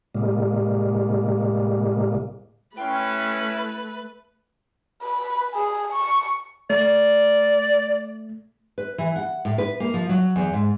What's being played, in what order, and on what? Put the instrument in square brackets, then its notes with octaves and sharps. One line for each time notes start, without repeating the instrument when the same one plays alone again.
[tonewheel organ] A2 C3 G3 G#3 A#3
[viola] A3 B4 [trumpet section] C#4 E4 [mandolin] G5 C6 F6
[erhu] B4
G#4
C#6
[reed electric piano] A3 [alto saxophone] D5
[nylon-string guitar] B4
E3
F#5
A2
B4
A#3
F3
F#3
E2
G#2